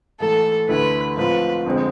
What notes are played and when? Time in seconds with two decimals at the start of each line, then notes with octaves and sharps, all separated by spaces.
0.20 G#2 E3 A3 A4
0.68 D2 D3 A3 E4 B4
1.17 G#2 F3 A3 C4 F4 B4
1.66 F2 D3 G#3 C4